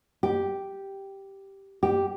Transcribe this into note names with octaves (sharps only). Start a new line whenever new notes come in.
G4
G4